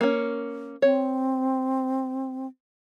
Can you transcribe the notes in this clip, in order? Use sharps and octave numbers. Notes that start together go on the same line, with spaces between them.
A#3 C#4
C4 C#5